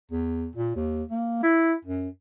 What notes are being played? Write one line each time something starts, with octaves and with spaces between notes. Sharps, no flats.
E2
A#2
D#2
A#3
E4
F#2